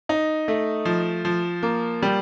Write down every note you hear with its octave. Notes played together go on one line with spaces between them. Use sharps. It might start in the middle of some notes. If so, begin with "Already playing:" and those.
D#4
A3
F3
F3
A#3
G3